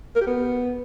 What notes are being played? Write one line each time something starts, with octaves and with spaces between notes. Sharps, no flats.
A#4
G4
B3